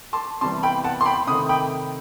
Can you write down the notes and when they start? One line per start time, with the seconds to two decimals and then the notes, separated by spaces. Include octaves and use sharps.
0.13 A5 C6
0.41 C3 E3 G3 B3 A5 C6
0.63 G5 B5
0.84 F#5 A5
1.01 C6
1.06 G5 B5
1.27 C3 D#3 A3 B5 D#6
1.49 G5 B5